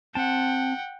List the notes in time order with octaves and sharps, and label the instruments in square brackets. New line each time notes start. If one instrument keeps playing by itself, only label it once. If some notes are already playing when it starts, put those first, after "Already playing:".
[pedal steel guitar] C4 A5 [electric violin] F#5 G5